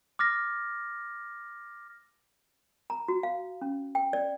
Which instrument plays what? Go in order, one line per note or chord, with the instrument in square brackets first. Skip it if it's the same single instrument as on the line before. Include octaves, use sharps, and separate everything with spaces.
[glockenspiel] D6 F6 A6 A#6
[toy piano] A#5
F#4
F5
C#4
G5
D5